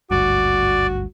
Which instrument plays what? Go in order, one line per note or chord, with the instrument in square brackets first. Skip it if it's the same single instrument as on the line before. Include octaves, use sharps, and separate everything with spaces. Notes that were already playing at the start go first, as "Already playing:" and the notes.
[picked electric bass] G#1 D2 G2 [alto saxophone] F#4 [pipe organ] D5